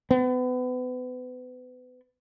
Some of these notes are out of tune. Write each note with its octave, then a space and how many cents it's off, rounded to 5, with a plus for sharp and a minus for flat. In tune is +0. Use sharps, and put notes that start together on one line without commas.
B3 +30